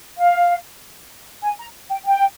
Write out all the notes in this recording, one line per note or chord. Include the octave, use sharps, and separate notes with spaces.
F5
G#5
A#5
G5
G5